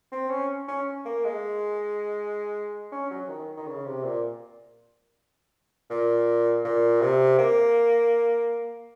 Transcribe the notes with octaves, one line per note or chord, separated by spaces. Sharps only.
C4
C#4
C#4
A#3
G#3
C#4
F#3
D#3
D#3
C#3
C3
A#2
A#2
A#2
C3
A#3